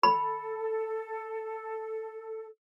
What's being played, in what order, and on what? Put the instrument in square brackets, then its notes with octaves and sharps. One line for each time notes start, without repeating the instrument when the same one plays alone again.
[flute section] A4 [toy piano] B5